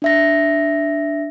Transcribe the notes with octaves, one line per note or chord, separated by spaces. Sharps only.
D4 E5 A#6